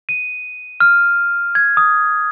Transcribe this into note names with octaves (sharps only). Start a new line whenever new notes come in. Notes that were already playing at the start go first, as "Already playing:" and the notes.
D#7
F6
G#6
D#6